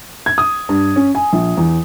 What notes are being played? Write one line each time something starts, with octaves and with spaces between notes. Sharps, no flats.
G#6
D#6
G2
C#4
G#5
A#1
E2